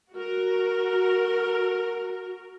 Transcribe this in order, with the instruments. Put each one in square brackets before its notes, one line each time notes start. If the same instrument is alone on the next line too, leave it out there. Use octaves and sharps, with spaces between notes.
[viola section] F#4 A#4